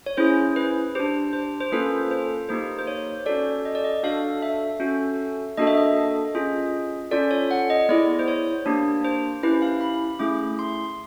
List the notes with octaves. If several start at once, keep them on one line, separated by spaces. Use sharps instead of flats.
C#5
C#4 E4 G#4 C5
B4
D4 G4 C5
C5
C5
A#3 C#4 F4 A4 B4
C5
A#3 D#4 G4 C5
C5
C#5
C#4 F#4 A4 D5
D#5
D5
D#5
D4 F#4 A4 F5
E5
C#4 F#4 A4
A#3 D4 F#4 A4 D#5
E5
D#5
C#4 F4 G#4
C#4 F4 A4 D5
C#5
F#5
D#5
B3 E4 G#4 D5
C5
C#5
A#3 D4 G4
C5
C#4 E4 G4 B4
F5
B5
A3 C#4 E4 G#4 D6
C6